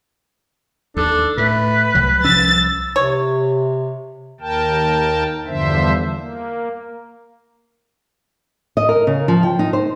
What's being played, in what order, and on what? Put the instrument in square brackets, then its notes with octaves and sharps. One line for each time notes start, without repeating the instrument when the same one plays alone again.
[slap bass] D#2 [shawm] D4 [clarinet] A4
[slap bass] A2 [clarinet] A3 [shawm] B4
[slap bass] C2 F#3
[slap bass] C2 F3 C#4 [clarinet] E6 [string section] A6
[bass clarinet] C3 [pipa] C#5
[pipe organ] D#2 A#4 G5 A5
E2 G2 D3 F3 C5 E5
A#3
[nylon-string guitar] D#5
A#4
C#3
F3
G5
D#4
C5